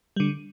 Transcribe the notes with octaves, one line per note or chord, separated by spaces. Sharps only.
D3 G3